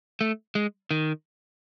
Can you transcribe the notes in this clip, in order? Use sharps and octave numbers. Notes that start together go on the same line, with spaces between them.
A3
G#3
D#3